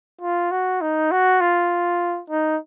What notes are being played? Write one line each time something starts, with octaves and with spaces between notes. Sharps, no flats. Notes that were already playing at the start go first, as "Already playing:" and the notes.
F4
F#4
D#4
F#4
F4
D#4